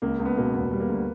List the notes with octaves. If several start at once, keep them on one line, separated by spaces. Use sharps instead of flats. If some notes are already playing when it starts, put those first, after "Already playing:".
C#2 A#3
C#2
B3
B2 A#3
E1 B3
G3
A#3
D2